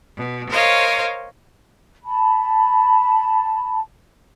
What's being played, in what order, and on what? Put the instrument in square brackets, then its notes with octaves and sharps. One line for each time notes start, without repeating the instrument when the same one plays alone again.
[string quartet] B2
A#4 C5 C#5 D#5 F5
[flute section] A5 B5